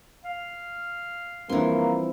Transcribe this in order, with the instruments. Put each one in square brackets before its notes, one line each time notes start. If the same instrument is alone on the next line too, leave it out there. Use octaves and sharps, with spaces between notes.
[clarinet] F5
[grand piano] G2 F3 C4 [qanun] E3 C6 [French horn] A#3